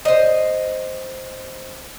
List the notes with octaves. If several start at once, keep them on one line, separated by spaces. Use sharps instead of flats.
C5 D#5